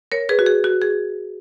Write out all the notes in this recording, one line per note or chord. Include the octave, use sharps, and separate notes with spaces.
A#4 C#5
G#4 B4
F#4
G#4
F#4
G#4